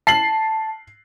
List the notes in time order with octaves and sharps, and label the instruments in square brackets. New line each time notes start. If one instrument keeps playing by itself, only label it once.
[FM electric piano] A5 [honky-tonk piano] C7 F#7